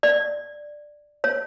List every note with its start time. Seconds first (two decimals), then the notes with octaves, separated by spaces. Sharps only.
0.03 D5
1.24 C#5